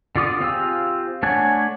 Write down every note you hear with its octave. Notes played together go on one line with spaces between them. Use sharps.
D3 F4 D6 D#6
C4 F4 G4 G#4 E6
A3 D4 C#5 F#5 G#5